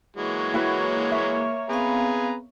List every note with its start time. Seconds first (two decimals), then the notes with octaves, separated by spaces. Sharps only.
0.16 E3 F#3 G#3 A#3 C#5
0.54 E4 F#4 B4
1.12 E5
1.69 B3 C4 G#4 B4 F5 A#5